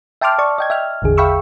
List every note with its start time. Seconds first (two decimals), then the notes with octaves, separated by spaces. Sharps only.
0.21 E5 G5 A5 C6 D6 F6
0.39 D5 A5 C#6
0.58 D#5 G5 G#6
0.70 E5 G5 F6
1.02 A1 E2 D3 G#4
1.17 E5 F5 G5 B5 C#6 E6